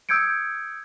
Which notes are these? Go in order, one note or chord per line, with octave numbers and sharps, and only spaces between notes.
D#6 E6 G6 G#6 C#7 D7